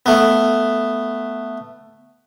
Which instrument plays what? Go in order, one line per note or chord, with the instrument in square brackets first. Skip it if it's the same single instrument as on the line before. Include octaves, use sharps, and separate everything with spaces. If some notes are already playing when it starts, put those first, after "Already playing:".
[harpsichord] A3 B3